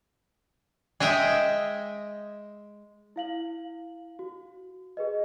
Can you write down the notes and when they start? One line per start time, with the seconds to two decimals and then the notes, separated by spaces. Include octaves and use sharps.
1.00 G#3 D#5 E5 G5
3.16 E4 F5 F#7
4.19 F#4
4.97 G#4 B4 D#5